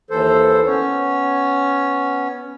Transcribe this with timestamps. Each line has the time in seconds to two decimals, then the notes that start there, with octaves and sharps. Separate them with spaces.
0.10 D#2 E3 A4 C5
0.67 B3 C#4 C#5